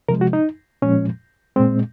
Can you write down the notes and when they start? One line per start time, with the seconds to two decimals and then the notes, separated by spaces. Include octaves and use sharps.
0.09 C3 F3 G#3 A#4
0.21 F#4
0.33 D#4
0.82 A#2 F3 G#3 C#4
1.56 A#2 G#3 C4